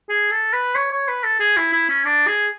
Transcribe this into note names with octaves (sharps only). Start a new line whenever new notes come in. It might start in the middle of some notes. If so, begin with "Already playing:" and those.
G#4
A4
B4
C#5
C#5
B4
A4
G#4
E4
E4
C#4
D4
G#4